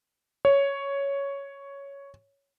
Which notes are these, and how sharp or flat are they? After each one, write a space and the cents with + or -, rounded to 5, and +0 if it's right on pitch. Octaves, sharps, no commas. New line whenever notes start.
C#5 +5